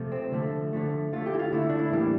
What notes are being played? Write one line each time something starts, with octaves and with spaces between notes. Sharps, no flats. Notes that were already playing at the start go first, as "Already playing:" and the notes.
Already playing: C3 F3 A3
C4
D3 F3 A3
D3 F3 A3
D3 A3 F4
G4
E4
F4
D3 A3 E4
D4
E4
A2 E3 G3 A#3 D4